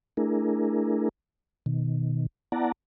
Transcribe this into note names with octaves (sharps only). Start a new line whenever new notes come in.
A3 D4 E4 G#4 A#4
B2 D#3
B3 E4 D5 F#5 A5 A#5